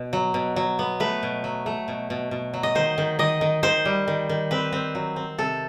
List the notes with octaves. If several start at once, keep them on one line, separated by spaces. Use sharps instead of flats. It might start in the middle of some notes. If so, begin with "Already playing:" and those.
Already playing: B2
F#3
B2
F#3
B3
A3 B4
B2
F#3
A3
B2
B2
B2
F#3
D#5
D#3 C5
D#3
D#3 D#5
D#3
D#3 C5
G3
D#3
D#3
C4 B4
C4
F#3
C4
C3 A4